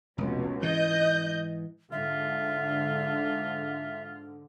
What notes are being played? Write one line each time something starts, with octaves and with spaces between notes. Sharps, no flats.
F1 C#2 B2
G#2 E3 D#5 G6
G#2 D3 F4 E5